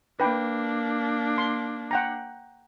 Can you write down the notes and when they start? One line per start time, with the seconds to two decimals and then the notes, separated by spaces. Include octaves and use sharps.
0.20 A#3 D4 B4 G5 B5
1.38 C6
1.91 F#5 G5 A#5